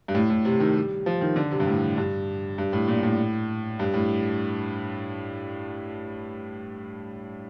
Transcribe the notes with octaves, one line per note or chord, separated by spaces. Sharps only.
G2
A2
A2
C3
D#3
G3
F3
D#3
D3
C3
G2
A2
G2
G2
A2
A#2
A2
G2
A2